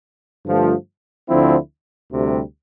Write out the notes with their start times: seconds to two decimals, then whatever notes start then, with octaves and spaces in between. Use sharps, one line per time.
0.45 G2 D3 F3 A3
1.28 D2 D3 F3 C4 E4
2.11 D2 C3 G3